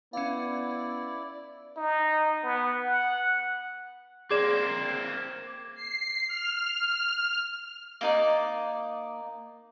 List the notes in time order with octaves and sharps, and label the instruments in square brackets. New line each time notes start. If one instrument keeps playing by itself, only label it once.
[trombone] B3 [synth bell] C#4 F5 [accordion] E4 D5
[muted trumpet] D#4
B3
F#5
[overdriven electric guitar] A#3 C4 [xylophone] G#4 D5 [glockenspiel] D6 G#6 E7
[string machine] C7
F6
[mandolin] A#3 D#4 D5